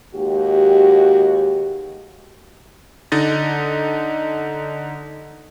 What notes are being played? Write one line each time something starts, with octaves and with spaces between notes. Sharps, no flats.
D#2 G#3 F#4 G4
D3 D#4 D#5 A6